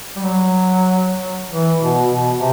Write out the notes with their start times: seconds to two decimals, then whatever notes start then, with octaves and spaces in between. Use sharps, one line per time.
0.16 G3
0.23 F#3
1.52 E3
1.81 B2
2.09 B2
2.38 C3